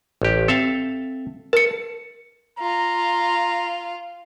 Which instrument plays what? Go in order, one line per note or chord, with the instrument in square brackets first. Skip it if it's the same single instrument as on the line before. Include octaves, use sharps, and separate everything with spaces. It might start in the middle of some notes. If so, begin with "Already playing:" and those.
[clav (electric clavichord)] A1 G4
[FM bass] C4 [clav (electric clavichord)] A4 E5 F5
[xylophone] A#4 C#7 [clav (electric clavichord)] A5
[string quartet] F4 [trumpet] A#5